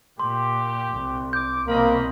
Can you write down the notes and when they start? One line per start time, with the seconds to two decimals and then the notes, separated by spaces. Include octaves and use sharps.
0.20 A#2 G4 C6
0.93 C2
1.33 D6 G6
1.68 C2 B2 A#3 C4 D#5 B5